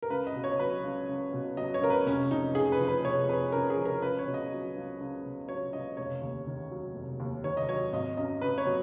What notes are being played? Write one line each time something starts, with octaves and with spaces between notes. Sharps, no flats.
A#4
C#2 B4
D#5
B2
C#5
F#3 B4
C#2
C#2
B2
F#3 D#5
C#5
C#2 A#4
B4
F1 C#4
F2 D#4
C#3 G#4
B4
F3
B4
F1 C#5
F2 B4
C#3 A#4
G#4
F3
A#4
C#2 B4
C#5
B2
D#5
F#3
C#2
C#2
B2
F#3 C#5
C#2 D#5
F1 C#5
D#2
D#3
F#3
F1
D#2
D#3 C#5
D#5
F#3 C#5
G#1 D#5
F#2 D#5
C#3 B4
C#5
F#3